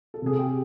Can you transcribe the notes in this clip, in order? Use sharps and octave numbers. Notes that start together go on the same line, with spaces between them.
A4
C3 G#4
G4